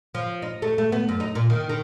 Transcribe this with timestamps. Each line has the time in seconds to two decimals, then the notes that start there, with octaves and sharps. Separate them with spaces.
0.15 F3
0.42 D#4
0.62 A3
0.78 A3
0.92 B3
1.09 F#2
1.20 D#4
1.35 A#2
1.50 D#3
1.69 D#3